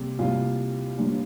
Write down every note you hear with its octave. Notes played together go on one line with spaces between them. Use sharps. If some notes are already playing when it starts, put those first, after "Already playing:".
Already playing: C3 G3 A#3
C2 C3 G3 A#3 F4
G1 G2 G3 A#3